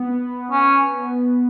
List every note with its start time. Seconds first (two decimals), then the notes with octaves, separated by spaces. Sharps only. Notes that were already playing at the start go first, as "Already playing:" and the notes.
Already playing: B3
0.51 C#4